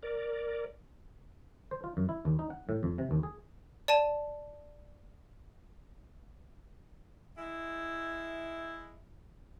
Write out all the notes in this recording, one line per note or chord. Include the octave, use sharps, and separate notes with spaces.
A#4 D5
C5
F4
F#2
E4
D#2
D#4
F#5
A2
F2
C3
D#2
G#4
D5 A5 D#7
G#3 E4